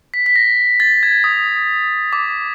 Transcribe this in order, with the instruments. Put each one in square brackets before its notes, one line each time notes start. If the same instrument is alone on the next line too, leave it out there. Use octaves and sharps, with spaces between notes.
[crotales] B6
B6
A#6
A6
G#6
D#6
D6